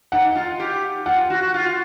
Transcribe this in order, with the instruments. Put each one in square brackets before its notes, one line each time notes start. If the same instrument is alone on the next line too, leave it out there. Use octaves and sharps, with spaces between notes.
[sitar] D#4 [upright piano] F#5
[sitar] F4
G4
[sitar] F4 [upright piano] F#5
[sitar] F#4
F4